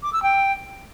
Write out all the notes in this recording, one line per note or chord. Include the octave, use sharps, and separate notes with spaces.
D6
E6
G5